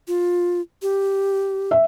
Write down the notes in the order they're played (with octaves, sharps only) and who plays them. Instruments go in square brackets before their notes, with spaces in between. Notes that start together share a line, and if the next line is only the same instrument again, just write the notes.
[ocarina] F4
G4
[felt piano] E5